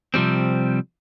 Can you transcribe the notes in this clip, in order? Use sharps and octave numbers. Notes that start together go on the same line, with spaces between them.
C3 F3 G3 C4